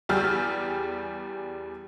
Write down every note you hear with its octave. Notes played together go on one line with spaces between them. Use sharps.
E2 G3 G4 G#4 E6 F6